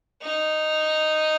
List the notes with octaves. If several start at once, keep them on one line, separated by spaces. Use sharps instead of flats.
D#4